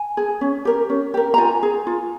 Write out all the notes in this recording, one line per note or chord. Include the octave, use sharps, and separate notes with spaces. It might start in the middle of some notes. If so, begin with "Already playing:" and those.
Already playing: G#5
G#4
C#4
G4 A#4
C#4
G4 A#4
A#5
F4 G#5
G#4
F4